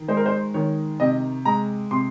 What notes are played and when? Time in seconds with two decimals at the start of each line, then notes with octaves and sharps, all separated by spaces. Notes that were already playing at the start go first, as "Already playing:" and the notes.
Already playing: D#3
0.08 G#3 C5
0.17 A#4
0.26 C5
0.54 D#3 C#5
1.00 C3 D#5
1.45 G#3 A#5
1.91 C3 C6